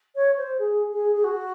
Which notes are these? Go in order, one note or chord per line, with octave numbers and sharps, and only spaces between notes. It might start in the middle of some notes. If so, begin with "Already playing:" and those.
C#5
C5
G#4
G#4
G#4
F#4